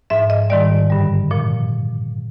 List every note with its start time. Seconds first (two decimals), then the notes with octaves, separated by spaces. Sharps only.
0.10 G#2 F3 E5
0.30 D#5
0.50 G#2 D#3 G3 D5
0.90 G2 D3 G3
1.31 A#2 F3